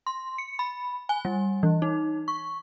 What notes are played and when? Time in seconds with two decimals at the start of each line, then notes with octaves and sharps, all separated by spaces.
0.07 C6
0.38 C#7
0.59 B5
1.09 G#5
1.25 G3
1.63 E3
1.82 D#4
2.28 C#6